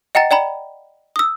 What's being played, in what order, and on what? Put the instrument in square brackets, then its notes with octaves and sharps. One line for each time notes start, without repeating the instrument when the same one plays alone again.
[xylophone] D#5 F#5 G5 A#5 A6
D5 G5 A#5 B5
D#6 E6